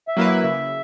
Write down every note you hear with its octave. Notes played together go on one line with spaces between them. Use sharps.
E5
F#3 A#3 E4 B4
E5
C#3 E5